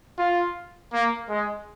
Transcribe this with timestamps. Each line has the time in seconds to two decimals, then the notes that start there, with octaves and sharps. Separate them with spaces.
0.19 F4
0.93 A#3
1.29 G#3